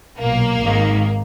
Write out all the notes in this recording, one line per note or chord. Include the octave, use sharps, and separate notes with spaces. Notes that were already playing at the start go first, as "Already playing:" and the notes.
B1 A#2 A#3
G#1 G#2 D#3